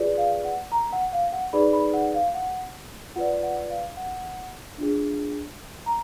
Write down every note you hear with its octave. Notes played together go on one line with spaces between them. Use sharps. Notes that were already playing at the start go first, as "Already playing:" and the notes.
Already playing: F4 G#4 B4 D5
F5
F#5
A#5
F#5
F5
F#5
D#4 G#4 B4 D5 B5
B5
F#5
F5
F#5
F4 B4 D5 F#5
F#5
F5
F#5
D4 F4 G#4
A#5